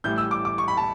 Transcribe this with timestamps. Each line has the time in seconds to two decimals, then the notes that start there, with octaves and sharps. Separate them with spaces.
0.04 A1 A2 E3 G3 G6
0.18 E6
0.31 D6
0.45 D6
0.58 C#6
0.68 B5
0.77 A5